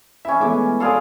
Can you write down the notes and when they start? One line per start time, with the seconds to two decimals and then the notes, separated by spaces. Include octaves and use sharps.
0.25 C#4 E4 E5
0.40 E3 G#3 A3 B3 E5 D6
0.80 G#4 A4 D5 F5 C6